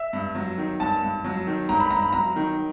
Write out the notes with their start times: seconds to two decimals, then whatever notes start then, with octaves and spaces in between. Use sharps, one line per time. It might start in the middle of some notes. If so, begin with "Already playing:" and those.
Already playing: E5
0.13 G2
0.35 F#3
0.58 D#3
0.80 G2 A5
1.03 G2
1.24 F#3
1.47 D#3
1.69 G2 A#5
1.80 B5
1.90 G2 A#5
2.02 B5
2.13 F#3 A#5
2.36 D#3